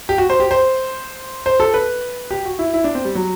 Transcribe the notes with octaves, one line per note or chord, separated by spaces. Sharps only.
G4
F#4
C5
G4
C5
C5
A4
B4
G4
F#4
E4
E4
D4
C4
G3
F#3